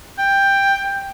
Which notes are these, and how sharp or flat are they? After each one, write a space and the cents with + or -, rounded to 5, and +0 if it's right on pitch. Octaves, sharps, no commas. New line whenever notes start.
G5 +10